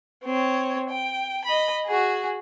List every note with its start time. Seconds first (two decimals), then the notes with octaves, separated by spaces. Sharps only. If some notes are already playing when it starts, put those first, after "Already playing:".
0.24 C4 C#5
0.89 G5
1.44 D#5 B5
1.85 F#4 G#4